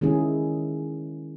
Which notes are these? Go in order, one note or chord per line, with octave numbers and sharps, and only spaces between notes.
D#3 G#3 C#4 E4 G#4